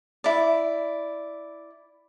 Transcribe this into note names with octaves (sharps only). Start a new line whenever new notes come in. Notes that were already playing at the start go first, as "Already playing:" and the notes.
E4 D5